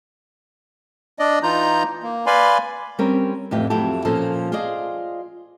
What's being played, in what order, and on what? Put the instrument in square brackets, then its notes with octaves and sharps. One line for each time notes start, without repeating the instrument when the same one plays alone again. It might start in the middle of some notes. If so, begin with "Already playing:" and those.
[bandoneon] D4 D5 D#5
E3 D#4 F4 A#5 G6
A#3
B4 D5 F5 G#5 B5 C6
[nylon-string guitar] G3 C4 C#4 A#4 C#5
F2 A2 E3 D4 G4
F2 F#3 A3 E4 G4 A5
A#2 F3 A#3 C#4 A4 C5
F4 G#4 C5 D5 D#5